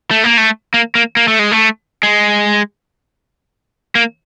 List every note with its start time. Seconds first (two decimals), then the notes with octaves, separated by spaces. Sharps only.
0.11 A3
0.24 A#3
0.37 A3
0.74 A#3
0.95 A#3
1.17 A#3
1.28 A3
1.39 G#3
1.52 A3
2.03 G#3
3.95 A#3